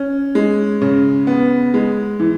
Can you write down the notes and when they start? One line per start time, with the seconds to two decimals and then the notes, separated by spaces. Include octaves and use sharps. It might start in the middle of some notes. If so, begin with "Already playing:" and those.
Already playing: C#4
0.35 G#3
0.82 C#3
1.27 B3
1.74 G#3
2.20 E3